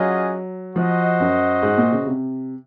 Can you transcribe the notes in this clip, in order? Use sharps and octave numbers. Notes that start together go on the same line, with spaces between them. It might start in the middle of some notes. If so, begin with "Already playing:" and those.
Already playing: F#3 C#4 F4 G#4 D#5 F#5
F3 F#4 C5 D#5 F#5
F#2
G#2
A#2
C#3
C3